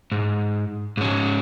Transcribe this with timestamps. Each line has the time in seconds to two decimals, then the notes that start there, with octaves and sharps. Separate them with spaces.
0.12 G#2
0.97 G#2 C#4